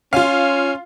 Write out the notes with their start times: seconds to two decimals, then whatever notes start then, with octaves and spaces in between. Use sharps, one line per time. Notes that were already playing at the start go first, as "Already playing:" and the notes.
0.13 C#4 F4 F5